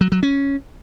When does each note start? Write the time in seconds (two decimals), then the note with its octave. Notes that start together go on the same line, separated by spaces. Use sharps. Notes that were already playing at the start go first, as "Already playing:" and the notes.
0.01 F#3
0.12 F#3
0.23 C#4